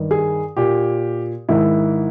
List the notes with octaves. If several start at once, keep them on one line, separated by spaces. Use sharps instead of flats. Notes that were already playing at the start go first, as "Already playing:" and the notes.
Already playing: G2 D#3
G#4
A#2 G4
G#2 D#3 E4